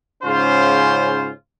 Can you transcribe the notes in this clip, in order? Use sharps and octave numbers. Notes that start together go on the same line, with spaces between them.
G#2 C#3 C#4 F4 C5